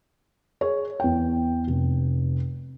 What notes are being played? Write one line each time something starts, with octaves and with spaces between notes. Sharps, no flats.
G#4 C#5
E2 G5
F1